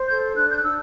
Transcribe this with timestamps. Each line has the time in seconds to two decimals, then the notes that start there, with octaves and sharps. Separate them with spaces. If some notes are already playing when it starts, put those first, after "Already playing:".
Already playing: C5
0.08 A4 G6
0.35 D4 F#6
0.50 G6
0.56 F#6
0.63 D4 E6